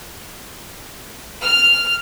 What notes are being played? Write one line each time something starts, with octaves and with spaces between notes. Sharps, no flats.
F6